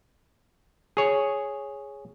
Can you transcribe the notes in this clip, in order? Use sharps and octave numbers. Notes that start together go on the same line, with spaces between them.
G#4 C#5